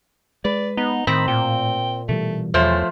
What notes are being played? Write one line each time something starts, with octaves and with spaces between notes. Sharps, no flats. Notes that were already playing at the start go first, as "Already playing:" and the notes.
G#3 B4 D5
B3 D#4
A2 D#3 C4 B5
A#2 G5
B2 E3 G3 A3
E2 F3 A3 C5 C#5